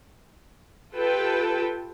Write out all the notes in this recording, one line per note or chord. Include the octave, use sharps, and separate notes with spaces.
F4 G4 A4 B4 G5 A5